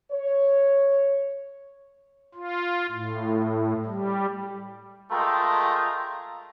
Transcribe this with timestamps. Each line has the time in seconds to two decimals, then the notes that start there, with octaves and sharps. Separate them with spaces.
0.12 C#5
2.35 F4
2.91 A2
3.85 G3
5.11 G#3 A3 F4 A#4 G5 A#5